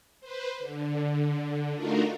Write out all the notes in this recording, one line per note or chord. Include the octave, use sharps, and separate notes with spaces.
B4 C5
D3
A3 D4 D#4 F4 F#4 A#4